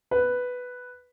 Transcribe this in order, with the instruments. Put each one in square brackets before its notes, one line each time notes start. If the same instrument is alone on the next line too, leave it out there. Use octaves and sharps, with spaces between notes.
[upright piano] B4